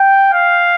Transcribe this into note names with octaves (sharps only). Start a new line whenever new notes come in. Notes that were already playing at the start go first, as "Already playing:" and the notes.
Already playing: G5
F5